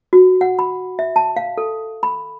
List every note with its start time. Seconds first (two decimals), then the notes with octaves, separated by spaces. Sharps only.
0.13 F#4
0.41 F#5
0.59 B5
0.99 E5
1.16 A5
1.36 F5
1.58 A4
2.03 B5